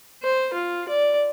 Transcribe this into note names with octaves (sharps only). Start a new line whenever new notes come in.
C5
F4
D5